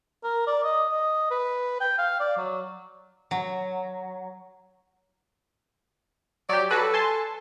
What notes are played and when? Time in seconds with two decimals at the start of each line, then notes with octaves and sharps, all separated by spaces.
0.24 A#4
0.47 D5
0.64 D#5
0.90 D#5
1.31 B4
1.80 G5
1.98 F5
2.20 D5
2.38 F#3
3.31 F#3
6.49 F#3 G4 D5
6.71 F#3 F#4 A4 B4
6.94 G#5 A5 C6